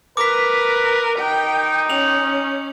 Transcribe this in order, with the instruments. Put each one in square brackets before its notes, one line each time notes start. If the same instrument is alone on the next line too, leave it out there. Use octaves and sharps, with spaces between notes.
[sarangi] A#4 [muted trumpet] B4 [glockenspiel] D6 B6
[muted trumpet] D#4 [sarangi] G5
[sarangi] C#4 [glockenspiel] F7 F#7